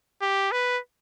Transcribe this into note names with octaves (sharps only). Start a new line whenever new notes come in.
G4
B4